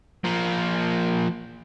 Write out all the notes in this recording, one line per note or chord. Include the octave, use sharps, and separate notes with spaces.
F3 A#3